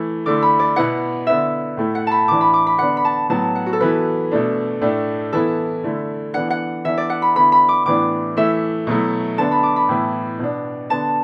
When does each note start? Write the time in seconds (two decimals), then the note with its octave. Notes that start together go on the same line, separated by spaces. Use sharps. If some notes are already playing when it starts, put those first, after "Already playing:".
Already playing: E3 A3 E4
0.26 D3 A3 E4 D6
0.42 B5
0.59 D5
0.76 B2 B3 E4 F#5
1.27 D3 B3 E4 E5
1.77 A2 A3 E4
1.95 F#5
2.07 A5 B5
2.28 A2 E3 D4 D6
2.41 B5
2.53 D6
2.67 B5
2.79 D3 B3 D4 F#5
2.97 B5
3.05 A5
3.30 A2 F#3 B3 A5
3.56 F#5
3.66 F#4
3.73 A4
3.80 E3 B3 E4 B4
4.31 B2 A3 D4
4.81 A2 A3 D4
5.33 E3 B3 E4 A4
5.83 D3 A3 E4
6.34 E3 B3 D4 F#5
6.50 F#5
6.85 E3 B3 D4 E5
6.98 D5
7.10 F#5
7.22 B5
7.35 D3 B3 E4 B5
7.52 B5
7.69 D6
7.86 A2 E3 B3 D4 D6
8.37 E3 A3 E4 E5
8.87 B2 F#3 A3 E4
9.38 D3 B3 D4 A5
9.51 B5
9.63 D6
9.76 B5
9.89 A2 E3 B3 E4
10.39 B2 B3 D4
10.90 D3 B3 D4 A5